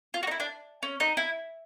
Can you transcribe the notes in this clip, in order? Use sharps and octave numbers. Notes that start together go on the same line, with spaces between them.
F4
F#4
D#4
E4
D4
C#4
D#4
E4